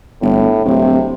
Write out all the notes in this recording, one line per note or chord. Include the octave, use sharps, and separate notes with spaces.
G1 A2
D1 C3